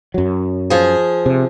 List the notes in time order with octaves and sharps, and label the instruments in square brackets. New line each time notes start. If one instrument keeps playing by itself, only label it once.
[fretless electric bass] F#2 F#3
[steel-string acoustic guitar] F3 G#4
[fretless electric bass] C3